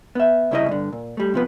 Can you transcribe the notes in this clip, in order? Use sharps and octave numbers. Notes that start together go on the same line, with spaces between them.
B3 E5
C2 C#3 E4 G#4 D#5
G2 D3
A#2
G3 A3
C3 F3 B3